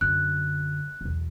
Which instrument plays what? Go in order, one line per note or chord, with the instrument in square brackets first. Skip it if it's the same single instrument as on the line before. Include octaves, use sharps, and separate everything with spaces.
[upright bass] F#2 D3 [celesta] F#6
[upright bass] B1 E2